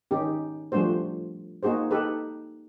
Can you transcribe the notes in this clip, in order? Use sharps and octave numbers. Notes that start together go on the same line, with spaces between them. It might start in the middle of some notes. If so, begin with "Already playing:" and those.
D#3 C#4 D#4 G4
F3 G3 A3 D4 F#4 C5
A#3 D#4 F#4 G#4 C5
D#4 G4 A4 B4